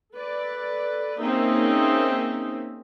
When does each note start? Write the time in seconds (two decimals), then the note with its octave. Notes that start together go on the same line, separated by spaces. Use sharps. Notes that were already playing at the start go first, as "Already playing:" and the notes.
0.13 A4 B4 D5
1.21 A#3 C4 C#4 D#4 G#4 E5